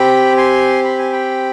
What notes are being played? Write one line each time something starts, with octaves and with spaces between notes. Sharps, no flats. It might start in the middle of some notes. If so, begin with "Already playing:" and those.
Already playing: C4 G4 G5 B5
G#5 C6
B5
G#5
G5 B5